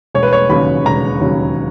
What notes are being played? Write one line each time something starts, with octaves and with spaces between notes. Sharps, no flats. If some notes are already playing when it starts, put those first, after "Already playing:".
E1 C#5
B4
C#5
D#2 C#3 F#3 B5
E1 A#5
D#2 C#3 F#3